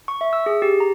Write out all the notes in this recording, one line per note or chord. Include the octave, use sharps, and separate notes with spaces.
C#6
E5
E6
G#4
G4
A#5